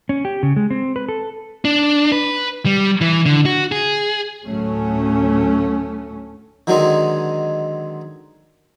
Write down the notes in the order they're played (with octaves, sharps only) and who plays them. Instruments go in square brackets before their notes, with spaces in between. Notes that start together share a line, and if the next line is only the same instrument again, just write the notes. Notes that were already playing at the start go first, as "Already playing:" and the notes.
[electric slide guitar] C#4
G4
C#3
G#3
C4
B4
A4
[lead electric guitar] D4
B4
G3
E3
D3
F#4
G#4
[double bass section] D2 A2 F#3 A3 C#4
[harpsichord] D3 D#3 F#3 G#3 C4 D#4